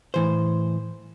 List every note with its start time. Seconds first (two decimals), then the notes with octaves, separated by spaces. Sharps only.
0.14 A2 E3 C5